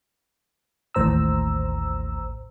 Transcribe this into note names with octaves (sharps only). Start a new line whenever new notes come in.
A1 D#2 A2 C5 A#5 E6